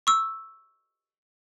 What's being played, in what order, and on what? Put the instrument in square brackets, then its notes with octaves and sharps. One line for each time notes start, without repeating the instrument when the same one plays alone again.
[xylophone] C#6 E6